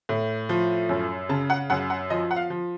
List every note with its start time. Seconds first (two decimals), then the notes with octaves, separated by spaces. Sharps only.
0.09 A2
0.49 F3
0.89 F#2
1.29 C#3 A5
1.50 F#5
1.70 F#2 F#5
1.90 F#5
2.10 F3 D#5
2.31 F#5
2.36 F5
2.50 F3